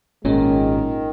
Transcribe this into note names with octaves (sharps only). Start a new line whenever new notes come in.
G#1 A#2 D#3 G#3 C#4